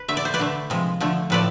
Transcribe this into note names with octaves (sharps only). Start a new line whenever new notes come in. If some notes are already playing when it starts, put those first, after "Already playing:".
Already playing: B4
D3 A3 E5
D5
C5
B4 D5
D3 A3
C3 F3 G#3
D3 F3 A3
A2 F3 A3 B4 D5